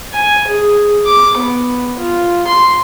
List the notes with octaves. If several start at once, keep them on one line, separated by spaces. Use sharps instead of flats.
G#5
G#4
D6
B3
F4
C6